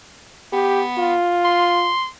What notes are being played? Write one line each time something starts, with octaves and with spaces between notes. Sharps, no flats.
B3 G4
F4
C6